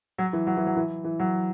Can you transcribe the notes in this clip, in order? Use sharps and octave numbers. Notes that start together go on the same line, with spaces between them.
F#3
E3
F#3
E3
F#3
E3
E3
F#3